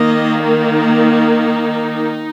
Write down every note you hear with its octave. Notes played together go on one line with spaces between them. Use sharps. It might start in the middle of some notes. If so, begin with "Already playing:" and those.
Already playing: D#3 A#3 D#5
D#4